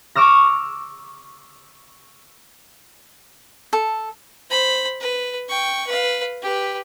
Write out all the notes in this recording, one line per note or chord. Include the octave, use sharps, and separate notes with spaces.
C#6 D6 E6 F6 A#6
A4
C5 B5
B4
G5 C#6
B4 F5
G4 B4